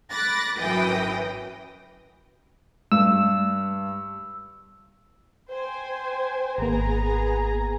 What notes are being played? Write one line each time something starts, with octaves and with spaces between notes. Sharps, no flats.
B5 D6 F#6 A6 A#6
G#1 F#2 E3 G5 D#6 A#6
G2 E6
C5 G5 G#5
G#1 A#3 B3 G#4 A#5